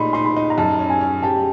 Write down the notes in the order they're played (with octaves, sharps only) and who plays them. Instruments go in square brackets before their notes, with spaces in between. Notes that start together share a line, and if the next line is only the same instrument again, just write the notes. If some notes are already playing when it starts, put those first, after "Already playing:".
Already playing: [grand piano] A#2 A3 D#4 [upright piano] B5 C6
[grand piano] D#4 [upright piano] C6
[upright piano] B5
[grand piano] D#4
[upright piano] A#5
[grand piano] F#2 [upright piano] A5
[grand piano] C#4
[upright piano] G#5
[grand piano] C#4
[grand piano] G4 [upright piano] A5